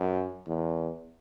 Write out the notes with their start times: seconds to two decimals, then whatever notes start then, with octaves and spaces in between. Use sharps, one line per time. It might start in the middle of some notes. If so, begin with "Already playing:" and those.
Already playing: F#2
0.47 E2